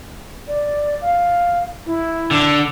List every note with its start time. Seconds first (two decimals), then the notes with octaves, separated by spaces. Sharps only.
0.48 D5
1.01 F5
1.86 E4
2.31 D3